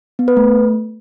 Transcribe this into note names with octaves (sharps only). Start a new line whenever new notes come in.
B3
B4
A3